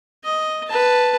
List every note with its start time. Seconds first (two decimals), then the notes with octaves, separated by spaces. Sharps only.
0.24 D#5
0.67 B4 A5